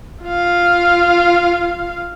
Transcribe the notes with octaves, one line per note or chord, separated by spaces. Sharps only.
F4 F5